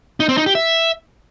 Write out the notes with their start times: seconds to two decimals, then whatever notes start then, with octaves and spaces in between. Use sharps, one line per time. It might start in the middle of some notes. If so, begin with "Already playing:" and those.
0.20 D#4
0.29 C4
0.38 D#4
0.46 G4
0.55 E5